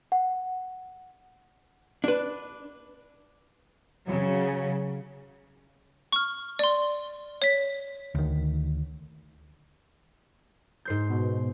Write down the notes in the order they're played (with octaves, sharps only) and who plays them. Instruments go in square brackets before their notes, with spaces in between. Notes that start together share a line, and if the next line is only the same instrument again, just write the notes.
[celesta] F#5
[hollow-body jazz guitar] D4 B4
[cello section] C#3 F#3
[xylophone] C#6 F6
D5 C6
C#5 B6
[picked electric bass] D2 D#3
[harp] G#2 C5 G6
[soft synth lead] B2